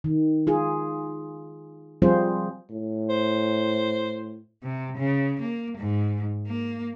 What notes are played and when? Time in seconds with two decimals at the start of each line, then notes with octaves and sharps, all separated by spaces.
0.04 D#3
0.47 F4 G#4
2.02 F3 G3 C4 F4 G#4 C5
2.70 A2
3.10 C5
4.63 C3
4.98 C#3
5.41 A#3
5.78 G#2
6.47 A#3